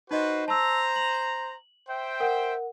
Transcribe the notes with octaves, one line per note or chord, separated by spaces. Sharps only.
D#4 F#4 B4 C5 D#5
C5 A5 A#5 E6
F#7
C5 E5 G5
A#4 F#5